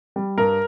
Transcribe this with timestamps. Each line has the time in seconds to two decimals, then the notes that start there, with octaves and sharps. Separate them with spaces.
0.16 G3
0.38 G2 A#4